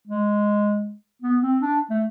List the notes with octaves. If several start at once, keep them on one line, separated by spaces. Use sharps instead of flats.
G#3
B3
C4
D4
A3